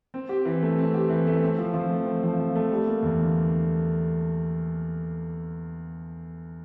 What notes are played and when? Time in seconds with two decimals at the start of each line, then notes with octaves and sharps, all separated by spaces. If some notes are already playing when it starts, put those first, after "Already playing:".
0.14 C4
0.29 G4
0.45 E3
0.62 A3
0.78 C4
0.94 G4
1.09 E3
1.27 A3
1.43 C4
1.58 F3
1.74 F3
1.90 A3
2.06 C4
2.23 F3
2.39 F3
2.55 A3
2.71 G3
2.87 A#3
3.03 E2
3.19 D3